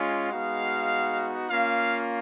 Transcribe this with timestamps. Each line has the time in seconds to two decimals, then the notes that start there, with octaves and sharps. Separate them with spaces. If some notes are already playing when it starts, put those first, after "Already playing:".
Already playing: G#3 C#4 F4
0.29 G#3 B3 D#4 F#4 F5
1.47 A#3 C#4 F4 F5